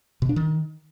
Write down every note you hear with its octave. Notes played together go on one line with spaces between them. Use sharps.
B2
D4
D#3